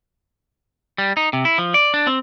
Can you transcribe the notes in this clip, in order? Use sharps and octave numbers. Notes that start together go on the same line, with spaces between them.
G3
D#4
C3
E4
F3
D5
D4
C4